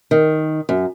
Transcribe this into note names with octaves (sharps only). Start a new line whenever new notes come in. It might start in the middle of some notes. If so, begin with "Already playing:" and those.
D#3
F#2